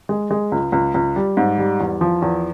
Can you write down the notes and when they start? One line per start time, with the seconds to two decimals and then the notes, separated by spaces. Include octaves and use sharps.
0.09 G#3
0.31 G#3
0.52 C#2
0.72 C#2
0.94 C#2
1.16 G3
1.37 G#2
1.58 G3
1.80 E2
2.01 F3
2.22 E2